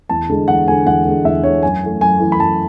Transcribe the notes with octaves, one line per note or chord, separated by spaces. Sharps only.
E2 A5
D3 G#3
E2 F#5
D3 G#3 G#5
E2 F#5
D3 G#3
E2 E5
D3 G#3 C#5
F#2 G#5
E3 A3
F#2 G#5
E3 A3
B5
F#2 A5